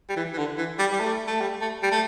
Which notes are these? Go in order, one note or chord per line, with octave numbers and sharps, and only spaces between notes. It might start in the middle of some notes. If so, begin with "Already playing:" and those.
G3
E3
E3
D3
E3
G3
G3
A3
A3
G3
A3
G3
A3